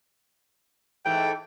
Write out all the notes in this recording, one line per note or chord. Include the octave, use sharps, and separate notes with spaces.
G#2 E3 A3 G5